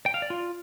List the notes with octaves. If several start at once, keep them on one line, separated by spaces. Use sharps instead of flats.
G5
F5
D5
F4